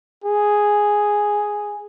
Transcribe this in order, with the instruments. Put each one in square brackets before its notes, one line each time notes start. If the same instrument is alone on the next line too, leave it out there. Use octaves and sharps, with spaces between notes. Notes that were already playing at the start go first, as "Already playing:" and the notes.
[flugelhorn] G#4